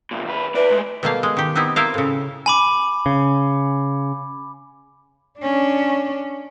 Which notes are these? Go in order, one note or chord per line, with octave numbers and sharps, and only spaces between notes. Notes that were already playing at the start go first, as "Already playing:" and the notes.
C2 A#2
D#2 B4
E4 B4 D5
G#3 A3
B2 G3 A3 A#3 G4 F5
G#3
D#3 G4
B3 C4 D#4 E4 G4
E4 F4 A#4 C5 F5
A2 C#3
G#5 B5 D6
C#3
C#4 D4